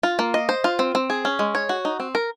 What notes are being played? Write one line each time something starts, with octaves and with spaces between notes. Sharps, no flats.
F4
A#3
D#5
C5
F4
C4
C4
G#4
C#4
G#3
C#5
F#4
D#4
C4
A#4